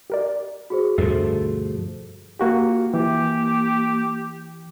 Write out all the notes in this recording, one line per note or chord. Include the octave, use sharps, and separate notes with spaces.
G4 A#4 D5
F#4 G#4 C5
D2 G2 B2 D3 F3 A3 C7
A#3 F#4 G4
F4
E3 A#3 G4